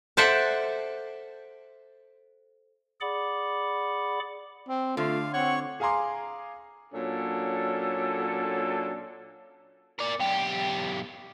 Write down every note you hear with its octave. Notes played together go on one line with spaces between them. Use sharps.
A4 C5 D5 E5 F#5 A5
G#4 D5 F#5 B5 D6
C4
D3 A3 F4 F5
C4 C#5 F#5 C#6
G#4 F5 G#5 A#5 C6 D6
A#2 F#3 C#4 D4 A4
A#4 D5
B1 G4